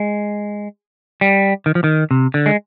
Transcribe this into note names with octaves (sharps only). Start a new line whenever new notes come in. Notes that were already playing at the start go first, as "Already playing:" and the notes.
Already playing: G#3
G3
D#3
F3
D#3
C3
D3
G#3